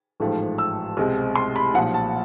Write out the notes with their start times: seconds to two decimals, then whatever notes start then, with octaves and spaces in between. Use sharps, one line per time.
0.20 A1 G#2 F3 A3
0.58 E6
0.97 C2 B2 G#3 C4
1.35 C6
1.56 B5
1.74 B1 A#2 F3 F#5
1.94 A5